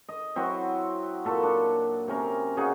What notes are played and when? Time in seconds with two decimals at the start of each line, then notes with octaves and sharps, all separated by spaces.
0.09 D#5
0.36 F#3 C4 E4 F#4
1.25 A#2 A4 B5 C#6
1.43 D4
2.08 C3 C#4 A#4
2.57 C#3 D#4 F#4 G#4